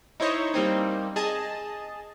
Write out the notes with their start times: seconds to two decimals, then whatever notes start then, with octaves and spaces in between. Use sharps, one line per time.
0.20 D#4 E4 C5 C#5 D#5
0.54 G3 A#3 C4 D#4
1.16 G#4 D#5 A5